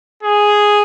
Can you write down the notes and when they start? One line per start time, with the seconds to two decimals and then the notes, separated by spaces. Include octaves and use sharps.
0.23 G#4